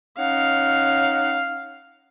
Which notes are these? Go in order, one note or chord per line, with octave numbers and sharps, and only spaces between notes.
C#4 D#4 F5 F#5